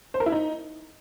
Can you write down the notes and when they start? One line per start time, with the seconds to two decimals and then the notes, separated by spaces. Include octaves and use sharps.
0.14 C5
0.20 A#4
0.26 E4
0.32 D#4